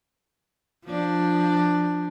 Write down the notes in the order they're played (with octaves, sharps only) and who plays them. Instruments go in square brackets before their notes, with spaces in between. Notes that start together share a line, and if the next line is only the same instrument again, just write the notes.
[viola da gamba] F3 D4